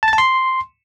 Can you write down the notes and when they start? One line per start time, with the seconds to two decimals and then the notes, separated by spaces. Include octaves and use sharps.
0.03 A5
0.08 A6
0.13 A5
0.18 C6